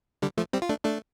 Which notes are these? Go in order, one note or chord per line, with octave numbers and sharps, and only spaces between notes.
D3 G3
F3 A3
G3 C4
F4
A3 D4
A3 D4